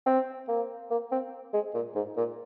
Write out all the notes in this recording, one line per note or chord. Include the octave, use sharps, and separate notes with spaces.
C4
A#3
A#3
C4
G#3
A#2
G#2
A#2